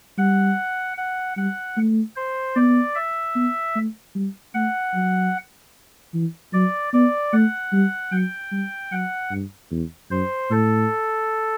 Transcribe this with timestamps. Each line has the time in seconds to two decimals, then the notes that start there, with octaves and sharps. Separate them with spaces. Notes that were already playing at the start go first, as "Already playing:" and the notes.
0.18 G3 F#5
0.97 F#5
1.37 G3 F#5
1.77 A3
2.16 C5
2.56 B3 D5
2.95 E5
3.36 B3
3.76 A3
4.15 G3
4.54 A3 F#5
4.94 F#3
6.14 E3
6.53 F#3 D5
6.93 B3 D5
7.33 A3 F#5
7.73 G3
8.12 F#3 G5
8.52 G3
8.92 F#3 F#5
9.31 G2
9.71 E2
10.10 F#2 C5
10.50 A2 A4